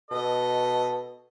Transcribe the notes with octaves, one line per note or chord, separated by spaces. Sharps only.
B2 A4 D#5